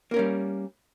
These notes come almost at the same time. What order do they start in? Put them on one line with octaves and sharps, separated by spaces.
A#3 A#4 C#4 G3